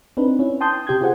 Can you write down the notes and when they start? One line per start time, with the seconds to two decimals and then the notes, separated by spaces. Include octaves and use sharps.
0.17 C4 D4 D#4 B4
0.39 C#4 E4
0.61 G5 A5 C6 D#6 G6
0.87 C3 G4 G6 G#6
1.01 F4 G#4 C5 F#5